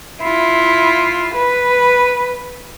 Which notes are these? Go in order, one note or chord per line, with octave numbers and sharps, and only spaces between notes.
E4 F4
B4